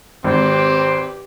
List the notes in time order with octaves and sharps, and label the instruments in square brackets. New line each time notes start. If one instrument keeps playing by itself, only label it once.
[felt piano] G#1 [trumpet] C4 [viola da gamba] G4 B4